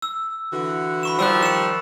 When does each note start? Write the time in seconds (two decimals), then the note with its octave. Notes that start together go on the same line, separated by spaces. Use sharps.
0.02 E6
0.52 D3 E3 F#4
1.03 B5 C#6 E7
1.19 D#3 F3 G3 E6 F#6
1.43 C#7 E7